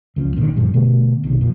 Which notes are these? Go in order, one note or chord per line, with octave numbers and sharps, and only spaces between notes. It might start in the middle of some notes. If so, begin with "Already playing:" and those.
C#2 F3 A3 C#4
G#1 A#2 D3 D#3
F#2 A#2 F3 G3
B2 D3 A3 B3
B1 C3 D#3
F2 A#2 F3